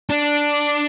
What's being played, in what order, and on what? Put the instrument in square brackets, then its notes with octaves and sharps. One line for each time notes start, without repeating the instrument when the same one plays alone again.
[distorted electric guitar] D4